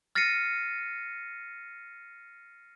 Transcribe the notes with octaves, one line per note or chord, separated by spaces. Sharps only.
F6 A6 A#6 C7 C#7 D#7